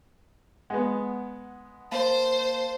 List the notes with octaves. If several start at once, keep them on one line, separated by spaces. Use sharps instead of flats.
G#3 B3 F#5
A#3 C5 F5 A5